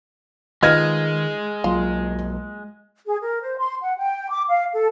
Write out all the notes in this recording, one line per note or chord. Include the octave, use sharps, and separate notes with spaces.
D#3 G#3 D#4 F4 B4 F6 G#6 A#6
B1 F#3 A#3 F4
G#4
A#4
C5
C6
F#5
G5
D6
F5
A4